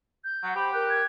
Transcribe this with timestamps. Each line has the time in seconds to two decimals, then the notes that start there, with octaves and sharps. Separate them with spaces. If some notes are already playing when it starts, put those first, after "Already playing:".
0.24 G6
0.43 F#3 F#5
0.55 G4 C5 B5
0.73 A#4 F#6 G6
0.89 G#6